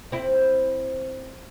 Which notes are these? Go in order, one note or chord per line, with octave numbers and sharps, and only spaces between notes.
C4 E4